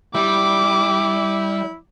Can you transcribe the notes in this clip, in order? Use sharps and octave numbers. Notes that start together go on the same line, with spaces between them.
G3 E4 D6